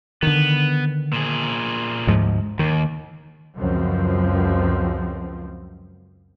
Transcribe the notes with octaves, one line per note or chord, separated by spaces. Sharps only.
D3 D#3 B3
A#2 G#4
D2 G#2 F3
D#2 D#3
C#2 F#2 F3 C4